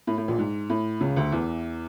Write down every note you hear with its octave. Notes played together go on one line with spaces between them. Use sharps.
A2
A2
A#1 A#2
G#2
A2
C#2 C#3
D2 D3
E2 E3